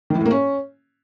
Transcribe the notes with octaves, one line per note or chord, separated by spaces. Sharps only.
D#3
E3
A2
A#3
C#4